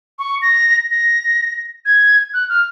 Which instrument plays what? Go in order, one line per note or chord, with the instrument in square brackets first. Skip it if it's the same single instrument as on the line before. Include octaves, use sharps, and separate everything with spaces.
[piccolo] C#6
A#6
A#6
G#6
F#6
F6